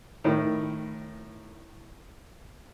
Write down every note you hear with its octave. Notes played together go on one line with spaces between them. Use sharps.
A2 D#3